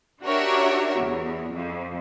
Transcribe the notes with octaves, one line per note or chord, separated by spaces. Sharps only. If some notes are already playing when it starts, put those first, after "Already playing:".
D4 F#4 G4 A#4 C#5 E5
E2
F2